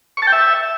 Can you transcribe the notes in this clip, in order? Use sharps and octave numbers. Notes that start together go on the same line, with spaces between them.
C#6
A5
G5
E5